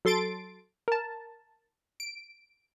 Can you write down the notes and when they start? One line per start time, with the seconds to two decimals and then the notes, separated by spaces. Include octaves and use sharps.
0.05 F#3 A4 C6 A6 D7
0.88 A#4 A5
2.00 D7